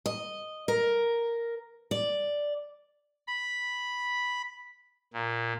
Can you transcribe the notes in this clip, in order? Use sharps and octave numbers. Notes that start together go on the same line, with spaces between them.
D#5
A#4
D5
B5
A#2